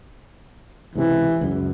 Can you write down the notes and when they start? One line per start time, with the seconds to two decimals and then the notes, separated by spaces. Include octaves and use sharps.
0.95 C#2 G#2 C3 E3
1.41 C#2 F#2